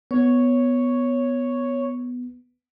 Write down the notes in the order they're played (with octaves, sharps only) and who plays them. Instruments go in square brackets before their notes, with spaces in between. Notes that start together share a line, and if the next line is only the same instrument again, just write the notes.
[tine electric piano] B3 [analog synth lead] C#5